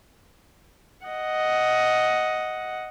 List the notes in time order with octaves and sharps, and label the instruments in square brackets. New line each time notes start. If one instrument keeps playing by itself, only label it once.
[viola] D#5 F#5